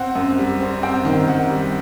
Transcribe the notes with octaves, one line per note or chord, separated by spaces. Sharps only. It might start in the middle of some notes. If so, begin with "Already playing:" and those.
Already playing: C4 F#5
F#2
G3
C4
C4 G5
D#3
D#3 F#5
G3